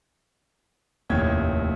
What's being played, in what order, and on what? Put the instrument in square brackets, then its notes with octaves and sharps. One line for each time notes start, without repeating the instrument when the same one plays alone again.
[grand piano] F1 D#2 A2 C#4 G5 G#6